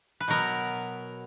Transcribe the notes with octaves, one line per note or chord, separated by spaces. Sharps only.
B4
B2 F#3 B3 A#4